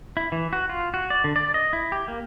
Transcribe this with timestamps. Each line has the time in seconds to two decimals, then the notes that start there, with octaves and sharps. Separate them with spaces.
0.17 E4
0.32 E3
0.53 F#4
0.70 F4
0.94 F#4
1.10 D5
1.24 D3
1.36 D5
1.54 D#5
1.73 E4
1.92 G4
2.08 A#3